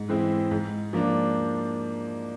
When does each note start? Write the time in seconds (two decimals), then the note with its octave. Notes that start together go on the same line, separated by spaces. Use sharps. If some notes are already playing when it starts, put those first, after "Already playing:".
Already playing: G#2
0.08 E3 G#3 C4 E4
0.51 G#2
0.93 F3 A#3 D4